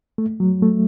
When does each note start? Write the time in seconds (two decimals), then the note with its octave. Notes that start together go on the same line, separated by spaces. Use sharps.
0.18 A3
0.40 F#3
0.62 A3